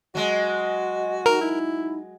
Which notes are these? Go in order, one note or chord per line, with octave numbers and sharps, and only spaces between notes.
F#3 G#3 F#4 D#5
D#4 A#4
E4